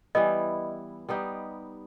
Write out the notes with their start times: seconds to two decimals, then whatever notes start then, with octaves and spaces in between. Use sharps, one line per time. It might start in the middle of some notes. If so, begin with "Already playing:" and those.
0.15 E3 G3 B3 E4 D#5
1.09 G3 B3 D#4 G4